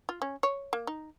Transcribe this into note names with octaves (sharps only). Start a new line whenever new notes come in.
F4
C#4
C#5
A#3
D#4